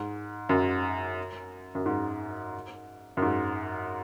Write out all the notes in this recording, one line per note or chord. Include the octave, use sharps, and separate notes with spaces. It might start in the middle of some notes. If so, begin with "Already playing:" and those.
Already playing: G#2
F#2
F#2
G#2
F#2
G#2